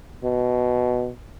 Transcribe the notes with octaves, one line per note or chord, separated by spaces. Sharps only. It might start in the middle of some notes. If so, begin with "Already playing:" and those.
B2